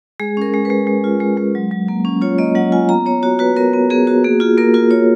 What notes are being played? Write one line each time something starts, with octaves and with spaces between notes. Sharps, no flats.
G#3 G#4
C#4 A#4
G#3
G#3 B4
G#3
F4
G#3
G#3
F#3
F#3
A#3
C#4
F4 C#5
A#3 D#5
F#3 F#5
F4 G#5
B3 A#5
B3 C#5
F#4 C#5
F#4 B4
B3 A#4
B3
B3 G#4
F#4
A#3 G#4
F4 G#4
A#3 A#4
F4 A#4
F4 C#5